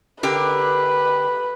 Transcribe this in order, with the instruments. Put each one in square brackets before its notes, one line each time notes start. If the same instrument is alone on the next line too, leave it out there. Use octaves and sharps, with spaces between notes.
[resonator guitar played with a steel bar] D3 G4 A#4 [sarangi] B4